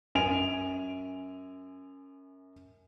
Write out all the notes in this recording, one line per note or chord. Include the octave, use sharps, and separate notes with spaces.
F#2 G#5 D7 F7